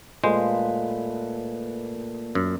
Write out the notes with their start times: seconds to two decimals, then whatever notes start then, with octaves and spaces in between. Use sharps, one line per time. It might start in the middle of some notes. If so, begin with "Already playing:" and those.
0.24 A#2 G#3 A3 B4 C5
2.35 F#2